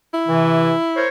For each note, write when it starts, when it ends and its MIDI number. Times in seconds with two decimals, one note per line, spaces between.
0.14 1.05 64
0.27 0.73 48
0.27 0.73 52
0.96 1.09 70
0.96 1.09 72
0.96 1.09 73